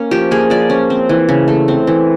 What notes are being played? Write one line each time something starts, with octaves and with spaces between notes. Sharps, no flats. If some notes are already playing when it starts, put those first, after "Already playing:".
Already playing: A#3 C#4
F3 G4
A#3 G#4
F3 D5
C#4
C4
E3
C#3
A3
C4
E3